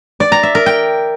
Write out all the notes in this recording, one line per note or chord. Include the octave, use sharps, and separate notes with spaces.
D5
A#5
E5
A#4
G5